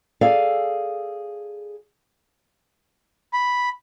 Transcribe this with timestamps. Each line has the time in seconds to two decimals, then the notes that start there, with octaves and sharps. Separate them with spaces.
0.21 G#4 A4 D5 F5 G#5
3.33 B5